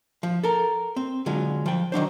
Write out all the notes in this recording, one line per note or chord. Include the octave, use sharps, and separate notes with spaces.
F3
A4 A#4
C4
D3 F#3 G#3 F4
F3 G5
D#3 F#3 D4 C5